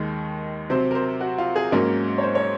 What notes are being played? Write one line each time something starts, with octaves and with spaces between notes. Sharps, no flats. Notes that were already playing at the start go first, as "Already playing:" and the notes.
Already playing: D#2 D#3 G#3
C3 F#3 C4 C5
A#4
C5
F#4
F4
G#4
G#2 F#3 A#3 C#4 A#4
C#5
C5
C#5